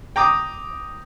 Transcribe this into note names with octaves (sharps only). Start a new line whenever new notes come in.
G5 A#5 D6 D#6